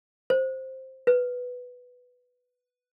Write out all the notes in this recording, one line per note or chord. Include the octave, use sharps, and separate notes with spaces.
C5
B4